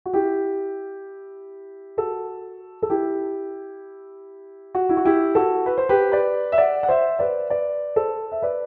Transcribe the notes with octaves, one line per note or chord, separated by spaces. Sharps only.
F#4
E4 G4
F#4 A4
A4
E4 G4
F#4
E4
F#4
E4 G4
F#4 A4
B4
C5
G4 B4
B4 D5
E5
D5 F#5
F#5
C5 E5
B4 D5
B4 D5
A4 C5
E5
B4 D5